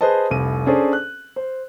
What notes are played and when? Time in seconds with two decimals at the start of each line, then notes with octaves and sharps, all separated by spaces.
0.01 G#4 B4 C5 D#5 A5
0.30 F1 C2 D#7
0.66 C#4 D4 G#4 A4 C5 D5
0.93 F#6
1.36 C5